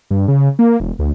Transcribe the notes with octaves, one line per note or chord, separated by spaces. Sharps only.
G2
C#3
A#3
E1
D2